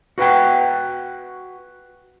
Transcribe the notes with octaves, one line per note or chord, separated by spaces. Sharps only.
F#4 B4 F#5 G5